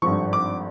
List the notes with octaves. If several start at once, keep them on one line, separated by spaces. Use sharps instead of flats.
G#1 G2 D3 F3 C#6
D6